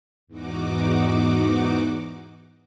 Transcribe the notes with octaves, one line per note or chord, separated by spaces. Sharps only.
E2 G#2 D#4 F#4 D6